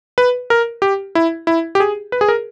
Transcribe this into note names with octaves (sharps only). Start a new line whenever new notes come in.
B4
A#4
G4
E4
E4
G4
G#4
B4
G#4
A#4